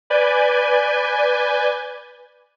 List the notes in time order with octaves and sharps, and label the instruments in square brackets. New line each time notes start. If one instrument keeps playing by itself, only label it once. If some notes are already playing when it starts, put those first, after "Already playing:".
[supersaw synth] B4 D5 G#5 G6